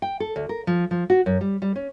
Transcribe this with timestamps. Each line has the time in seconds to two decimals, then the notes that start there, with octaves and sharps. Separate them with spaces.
0.02 G5
0.20 A4
0.36 D2
0.49 A#4
0.67 F3
0.91 F3
1.10 F#4
1.26 F#2
1.41 G3
1.62 G3
1.76 C#4